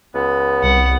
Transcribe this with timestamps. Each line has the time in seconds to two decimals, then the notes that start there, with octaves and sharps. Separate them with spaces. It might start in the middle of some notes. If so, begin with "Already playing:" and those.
0.14 C#2 B3
0.63 C2 F#5